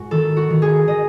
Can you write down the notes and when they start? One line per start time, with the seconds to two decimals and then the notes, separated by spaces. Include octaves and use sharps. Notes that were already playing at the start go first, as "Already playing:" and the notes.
Already playing: G#2 F#4
0.11 D#3 A4
0.37 F#4
0.50 D#3
0.62 G#4
0.87 D#3 D#5